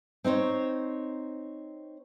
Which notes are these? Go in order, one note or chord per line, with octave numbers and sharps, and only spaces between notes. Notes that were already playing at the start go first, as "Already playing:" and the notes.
C4 D#4 C5 C#5